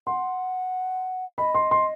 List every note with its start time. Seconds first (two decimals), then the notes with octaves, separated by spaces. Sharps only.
0.07 F#5 C6
1.38 D#5 B5
1.55 C6
1.71 C6